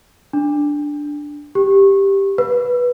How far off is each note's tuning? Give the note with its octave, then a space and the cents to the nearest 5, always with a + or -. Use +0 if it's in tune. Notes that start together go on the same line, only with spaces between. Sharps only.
D4 +0
G4 +5
B4 -10